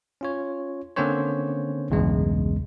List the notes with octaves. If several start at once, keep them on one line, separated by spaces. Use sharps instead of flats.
C#4 F4 C#5
D3 A#3 C4 C#4 C5 C#5
B1 E2 G2 C#3 G#3